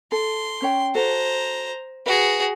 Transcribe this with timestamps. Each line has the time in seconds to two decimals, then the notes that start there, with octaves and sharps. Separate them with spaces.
0.12 A4 C6
0.62 C#4 C#5 G5
0.95 F#4 A4 C5 A#5
2.06 F#4 G#4 B4